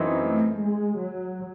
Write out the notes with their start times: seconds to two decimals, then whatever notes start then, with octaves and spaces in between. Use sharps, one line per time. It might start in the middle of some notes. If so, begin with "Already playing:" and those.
Already playing: F#2 E3 C4 D#4
0.19 A3
0.59 G#3
0.99 F#3